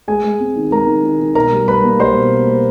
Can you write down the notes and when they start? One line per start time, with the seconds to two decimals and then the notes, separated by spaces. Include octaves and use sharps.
0.08 G#3 G#4 G#5
0.24 G#3
0.40 C4
0.56 D#3
0.71 G#3 A#4 A#5
0.87 D#3
1.03 D#3
1.20 D#3
1.35 B2 A#4 A#5
1.52 G3
1.67 G3 B4 B5
1.84 A#3
1.99 G3 C5 C6
2.16 B2
2.32 B2
2.47 A#3